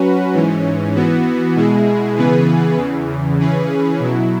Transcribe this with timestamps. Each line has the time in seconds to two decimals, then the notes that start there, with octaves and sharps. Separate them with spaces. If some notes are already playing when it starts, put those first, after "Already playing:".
Already playing: F#3 C#4 F#4 B4
0.33 G#2 E3 C#4
0.95 E3 B3 F#4
1.56 B2 G#3 E4 G#4
2.17 C#3 E3 B3 G#4 B4
2.78 E2 C#3 E3
3.39 C#3 E3 C#4 G#4 B4
4.00 B2 F#3 E4